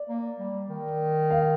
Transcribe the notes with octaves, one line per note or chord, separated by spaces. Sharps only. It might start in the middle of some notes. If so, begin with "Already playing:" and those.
Already playing: D5
A#3
G3
D#3
F5